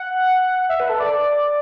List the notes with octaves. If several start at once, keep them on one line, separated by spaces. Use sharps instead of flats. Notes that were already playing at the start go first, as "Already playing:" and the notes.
Already playing: F#5
E5
B4
A4
D5